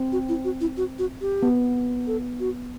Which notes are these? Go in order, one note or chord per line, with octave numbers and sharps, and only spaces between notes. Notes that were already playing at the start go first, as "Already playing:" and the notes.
Already playing: C4
F#4
E4
F#4
E4
F#4
F#4
G4
B3
A4
F#4